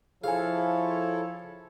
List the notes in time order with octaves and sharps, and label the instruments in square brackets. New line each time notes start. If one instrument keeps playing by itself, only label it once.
[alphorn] F3 [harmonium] E4 A4 C#5 [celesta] G#4 G#5 [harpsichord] F5